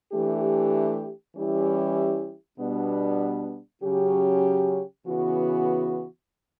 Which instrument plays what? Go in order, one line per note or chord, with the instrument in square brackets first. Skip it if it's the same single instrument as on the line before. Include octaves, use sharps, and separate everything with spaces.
[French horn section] E3 A3 D4 G4
E3 G3 C#4 E4 G4
B2 G3 B3 D4
C#3 F#3 C#4 G4
C#3 E3 B3 F#4